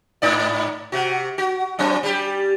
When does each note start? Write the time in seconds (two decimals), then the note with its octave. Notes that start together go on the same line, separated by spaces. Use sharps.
0.22 G#2 D#4 D5
0.92 C3 F#4
1.38 F#4
1.79 F#3 C4 D4
2.03 G3 G4